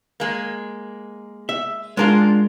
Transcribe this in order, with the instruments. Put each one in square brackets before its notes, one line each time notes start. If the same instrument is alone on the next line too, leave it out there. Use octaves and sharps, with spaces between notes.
[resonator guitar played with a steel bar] G#3 A#3
[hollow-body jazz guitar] E5
[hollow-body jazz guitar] G#3 A#4 [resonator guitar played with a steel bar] D4 F4